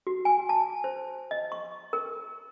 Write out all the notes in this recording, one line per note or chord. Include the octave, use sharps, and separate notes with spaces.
F#4
G#5
A5
C5
D#5
C#6
A#4